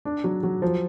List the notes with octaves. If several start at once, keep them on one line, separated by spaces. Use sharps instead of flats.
D4
F#3
F#3
F3